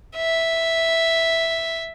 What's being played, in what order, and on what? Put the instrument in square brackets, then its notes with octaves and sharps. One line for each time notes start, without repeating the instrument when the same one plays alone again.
[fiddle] E5